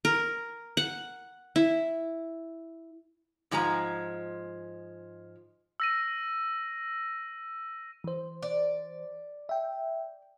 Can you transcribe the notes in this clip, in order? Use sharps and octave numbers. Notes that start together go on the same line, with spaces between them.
A#4
F#5
E4
G#2 F3 G#3 A5 A#5
E6 A#6 D#7
E3 C5
D5
E5 G5